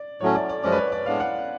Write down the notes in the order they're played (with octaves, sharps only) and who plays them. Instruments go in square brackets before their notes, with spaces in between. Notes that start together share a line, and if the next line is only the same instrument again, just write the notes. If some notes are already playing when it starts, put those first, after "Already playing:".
Already playing: [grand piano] D5
[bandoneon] A2 F#3 A3 C#4 [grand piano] C#5
[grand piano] D5
D5
[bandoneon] F#2 F3 G#3 C#4 [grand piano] D5
[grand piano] B4
C#5
D5
[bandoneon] A2 G#3 B3 D4 [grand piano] F5
[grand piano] F#5